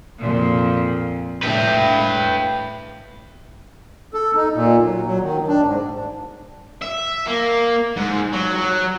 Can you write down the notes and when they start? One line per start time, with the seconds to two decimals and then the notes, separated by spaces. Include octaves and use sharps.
0.19 F2 A#2
1.43 A2 B4 G5
4.14 A4
4.35 D#4
4.55 A#2
4.83 F#3
5.05 F#3
5.22 D#3
5.47 D4
5.63 G#2
6.82 E5
7.28 A#3
7.96 G#2
8.33 F#3
8.53 F#3